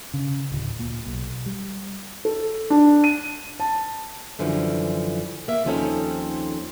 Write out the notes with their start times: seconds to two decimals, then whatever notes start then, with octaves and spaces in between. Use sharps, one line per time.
0.14 C#3
0.52 D1
0.79 A#2
1.06 B1
1.46 G3
2.25 A4
2.70 D4
3.04 D#7
3.60 A5
4.39 F#2 D3 E3 F3
5.48 A#3 E5
5.65 D#2 F3 C4 C#4 D#4 A4